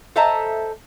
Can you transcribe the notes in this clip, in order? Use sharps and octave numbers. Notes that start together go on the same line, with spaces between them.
A4 C5 D#5 E5 A5 A#5